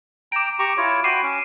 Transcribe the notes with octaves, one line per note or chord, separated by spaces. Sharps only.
G5 A#5 D6 D7
G4 A#5 C#6
E4 F4 C#5
F#4 G5 B5 D6 C7 D#7
C#4